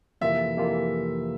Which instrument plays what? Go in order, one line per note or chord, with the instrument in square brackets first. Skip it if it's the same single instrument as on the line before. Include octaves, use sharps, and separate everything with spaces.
[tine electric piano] F2 C3 E3 A#3 F4 [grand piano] E5
[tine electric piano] F2 C3 E3 A#3 F4